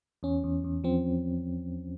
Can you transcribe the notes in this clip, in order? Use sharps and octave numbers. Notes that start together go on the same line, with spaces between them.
E2 C#4
E2
E2
F3 C4